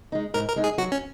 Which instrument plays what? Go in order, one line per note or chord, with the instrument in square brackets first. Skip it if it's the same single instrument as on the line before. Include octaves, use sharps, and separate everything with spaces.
[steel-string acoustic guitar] G#3 D#4
[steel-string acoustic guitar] G#2 [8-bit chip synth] A#4
[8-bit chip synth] A#4
[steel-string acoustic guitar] G#3 D#4
[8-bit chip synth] G#4
[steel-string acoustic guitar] F#3 [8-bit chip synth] F#4
[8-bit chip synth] C#4